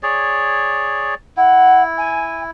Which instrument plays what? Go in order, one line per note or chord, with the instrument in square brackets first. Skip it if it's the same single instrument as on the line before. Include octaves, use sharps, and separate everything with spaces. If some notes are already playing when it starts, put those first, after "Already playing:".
[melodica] G#4 C#5 D5
[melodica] E4 [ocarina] F#5
[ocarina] G#5